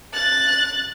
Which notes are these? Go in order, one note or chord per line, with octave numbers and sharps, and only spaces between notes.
F#6 A6